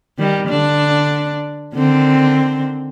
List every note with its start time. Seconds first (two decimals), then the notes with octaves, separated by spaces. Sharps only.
0.18 D#3 G3
0.48 D3 D4
1.75 D3 D#3 C4